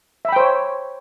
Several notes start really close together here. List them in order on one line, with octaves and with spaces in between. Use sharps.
E5 B5 G5 C5 C#5